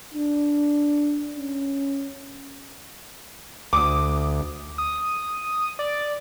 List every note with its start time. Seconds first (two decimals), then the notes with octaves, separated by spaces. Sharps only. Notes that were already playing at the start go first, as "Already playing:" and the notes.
0.15 D4
1.37 C#4
3.73 D2 D6 D#6
4.78 D#6
5.79 D5